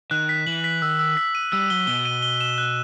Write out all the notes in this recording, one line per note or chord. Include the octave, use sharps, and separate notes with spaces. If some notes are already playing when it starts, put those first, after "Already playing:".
D#3 F#6
B6
E3 F#7
B6
D#3 E6
E6
B6
D#7
G3 E6
F#3 G7
B2 G7
D#7
G7
E7
F#6